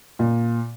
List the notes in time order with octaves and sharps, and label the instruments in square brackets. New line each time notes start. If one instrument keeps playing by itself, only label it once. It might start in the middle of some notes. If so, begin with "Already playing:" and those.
[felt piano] A#2